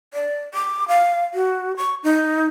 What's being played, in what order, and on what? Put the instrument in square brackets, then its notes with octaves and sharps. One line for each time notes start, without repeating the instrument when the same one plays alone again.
[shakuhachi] D5
D6
F5
F#4
C#6
D#4